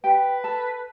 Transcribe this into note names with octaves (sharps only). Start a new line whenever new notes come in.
G4 B4 G5
A4 A5